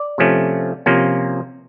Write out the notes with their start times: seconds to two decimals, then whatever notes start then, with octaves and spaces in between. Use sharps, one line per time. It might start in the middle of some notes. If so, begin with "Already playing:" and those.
Already playing: D5
0.18 C3 F3 A3 C#4
0.86 C3 F3 A#3 C#4